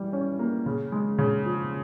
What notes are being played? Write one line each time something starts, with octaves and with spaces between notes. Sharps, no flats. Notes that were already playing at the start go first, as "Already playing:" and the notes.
Already playing: E3 G3
C#4
A#3
C#3
G#3
C#3
F3